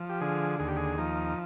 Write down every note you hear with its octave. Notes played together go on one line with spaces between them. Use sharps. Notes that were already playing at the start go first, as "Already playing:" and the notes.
Already playing: F3
G4
D3 G#4
D#2 G#4
G4
G#4
F3 D#4